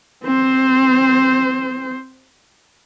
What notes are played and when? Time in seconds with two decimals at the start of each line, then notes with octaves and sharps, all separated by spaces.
0.23 C4 C5